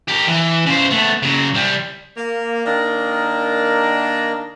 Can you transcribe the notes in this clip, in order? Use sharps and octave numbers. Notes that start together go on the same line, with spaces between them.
G4 A#4
E3
C#3 C5
A3 B3
C#3 F#3
C2 G3
A#3
D#3 A#3 D4 A#4 D#5